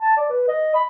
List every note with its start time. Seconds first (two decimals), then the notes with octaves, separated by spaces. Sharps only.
0.01 A5
0.17 D5
0.30 B4
0.48 D#5
0.75 B5